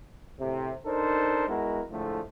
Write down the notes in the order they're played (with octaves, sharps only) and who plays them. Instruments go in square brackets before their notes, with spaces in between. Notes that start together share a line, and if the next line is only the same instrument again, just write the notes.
[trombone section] A2 C3
D4 D#4 A4 A#4 C5
G#3 B3 E4 F#4 A#4
A2 D3 F3 G#3 A3